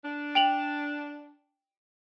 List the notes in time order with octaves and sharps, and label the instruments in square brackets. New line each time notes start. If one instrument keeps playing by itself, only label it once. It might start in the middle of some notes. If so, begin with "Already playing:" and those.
[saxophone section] D4
[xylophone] G5 F7 F#7